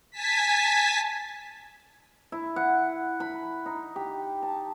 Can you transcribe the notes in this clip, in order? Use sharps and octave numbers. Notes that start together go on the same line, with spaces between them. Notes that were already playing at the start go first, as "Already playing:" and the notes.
G#5 A5 B6
E4
F#5
B5
D#4
G4
A5